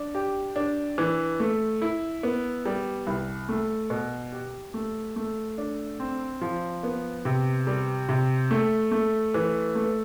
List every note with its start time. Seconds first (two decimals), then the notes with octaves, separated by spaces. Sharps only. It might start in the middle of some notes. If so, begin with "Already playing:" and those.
Already playing: D4
0.15 G4
0.56 D4
0.98 E3
1.40 A3
1.82 E4
2.23 B3
2.66 G3
3.07 C2
3.49 A3
3.90 B2
4.32 G4
4.74 A3
5.16 A3
5.58 D4
6.00 C4
6.41 F3
6.83 B3
7.25 C3
7.67 G3
8.09 C3
8.51 A3
8.91 A3
9.34 E3
9.75 A3